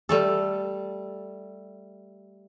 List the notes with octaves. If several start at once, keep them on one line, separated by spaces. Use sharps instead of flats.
G3 A3 A4